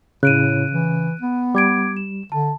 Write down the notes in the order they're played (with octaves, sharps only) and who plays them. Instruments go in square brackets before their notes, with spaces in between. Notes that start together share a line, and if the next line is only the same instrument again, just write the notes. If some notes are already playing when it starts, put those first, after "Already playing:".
[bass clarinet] A2 [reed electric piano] C#3 [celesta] F#6 D7 D#7
[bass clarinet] E3
B3
[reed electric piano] G3 [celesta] D6 G#6 D7
[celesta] E7
[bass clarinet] D3 [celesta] A5